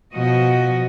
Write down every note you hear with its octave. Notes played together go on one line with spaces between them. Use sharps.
B2 F3 F#4 D#5